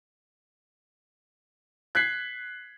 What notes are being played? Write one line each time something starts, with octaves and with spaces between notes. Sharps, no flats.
F#6 G#6 B6 C7